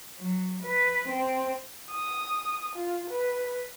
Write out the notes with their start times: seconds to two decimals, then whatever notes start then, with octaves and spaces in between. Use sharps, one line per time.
0.19 F#3
0.63 B4
1.09 C4
1.90 D#6
2.76 F4
3.10 B4